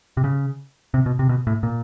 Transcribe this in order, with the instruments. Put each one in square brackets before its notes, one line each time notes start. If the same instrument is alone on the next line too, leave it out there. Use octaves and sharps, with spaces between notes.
[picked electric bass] C3
C#3
C3
B2
C3
B2
A2
A#2